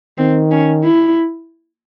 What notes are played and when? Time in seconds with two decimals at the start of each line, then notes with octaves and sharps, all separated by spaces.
0.18 D#3 C4
0.51 C#4
0.84 E4